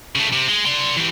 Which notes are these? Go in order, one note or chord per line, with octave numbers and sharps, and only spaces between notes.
C#3 A3
C3
G#3
D5 C6
E3 G4